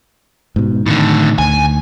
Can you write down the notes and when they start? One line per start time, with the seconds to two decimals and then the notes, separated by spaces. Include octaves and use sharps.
0.56 G#2 B2
0.86 A2 D3 D#3
1.39 D2 G#5